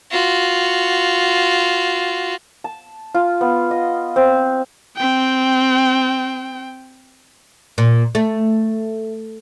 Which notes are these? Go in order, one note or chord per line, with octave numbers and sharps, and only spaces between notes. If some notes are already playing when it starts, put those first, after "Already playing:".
F4 F#4
A5
F4
B3
D#5
C4
C4 G5
A#2
A3